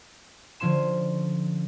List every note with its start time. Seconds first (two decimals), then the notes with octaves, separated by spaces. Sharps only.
0.60 D3 F3 C#4 C6 E7